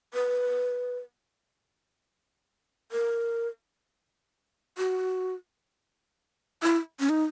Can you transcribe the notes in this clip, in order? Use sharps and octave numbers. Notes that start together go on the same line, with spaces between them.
B4
A#4
F#4
E4
C#4
D#4